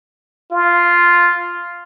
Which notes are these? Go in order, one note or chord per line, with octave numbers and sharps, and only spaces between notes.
F4